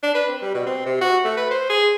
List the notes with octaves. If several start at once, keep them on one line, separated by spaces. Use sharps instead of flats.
D4
B4
C4
G3
B2
C4
C3
F#4
A3
B4
C5
G#4